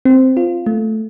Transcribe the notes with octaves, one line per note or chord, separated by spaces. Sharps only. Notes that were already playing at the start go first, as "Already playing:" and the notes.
C4
F4
A3